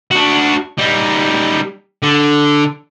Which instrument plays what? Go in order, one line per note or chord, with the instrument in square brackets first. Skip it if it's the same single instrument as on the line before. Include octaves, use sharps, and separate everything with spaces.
[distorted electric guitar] D4 F#4
G3 D#4
D3